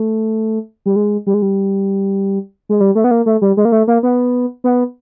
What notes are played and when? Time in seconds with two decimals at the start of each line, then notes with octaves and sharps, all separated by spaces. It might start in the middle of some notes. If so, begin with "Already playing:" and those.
Already playing: A3
0.86 G3
0.96 G#3
1.27 G3
1.34 G#3
1.42 G3
2.69 G#3
2.80 G3
2.95 A3
3.04 B3
3.11 A#3
3.26 A3
3.42 G3
3.57 G#3
3.65 A#3
3.72 A3
3.88 A#3
4.03 B3
4.64 B3